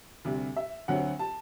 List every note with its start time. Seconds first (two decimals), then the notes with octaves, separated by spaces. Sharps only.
0.25 D2 C3 G3
0.56 E5
0.88 D2 D3 F#3 C4 F#5
1.19 A5